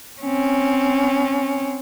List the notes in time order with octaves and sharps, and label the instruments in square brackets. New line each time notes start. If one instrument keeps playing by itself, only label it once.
[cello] C4 C#4